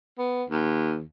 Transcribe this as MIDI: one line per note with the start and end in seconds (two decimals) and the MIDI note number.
0.18 0.44 59
0.50 1.02 39